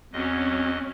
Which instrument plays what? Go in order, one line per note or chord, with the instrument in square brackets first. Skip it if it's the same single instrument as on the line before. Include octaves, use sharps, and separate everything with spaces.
[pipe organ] E2 D#5 [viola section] F#3 C#4 [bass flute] C4